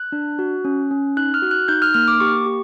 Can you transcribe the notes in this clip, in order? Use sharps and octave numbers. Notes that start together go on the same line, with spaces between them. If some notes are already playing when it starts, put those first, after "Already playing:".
Already playing: F#6
D4
F#4
C#4
C#4
D#4 F#6
F6
F#4
F#6
D#4 G6
F6
A#3 F6
D6
G4 C#6
G4